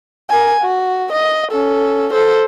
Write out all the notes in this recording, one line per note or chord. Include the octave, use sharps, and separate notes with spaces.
A#4 G#5
F#4
D#5
C#4 A4
A4 C5